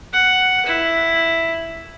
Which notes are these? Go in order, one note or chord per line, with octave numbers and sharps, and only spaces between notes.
F#5
E4